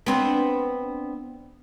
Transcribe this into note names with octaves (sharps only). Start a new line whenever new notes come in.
B3 C4 D4